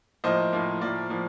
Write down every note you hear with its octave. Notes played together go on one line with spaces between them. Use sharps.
A2 F3 A#3 C5 D#5
A2 F3 A#3
A2 F3 A#3 D5
A2 F3 A#3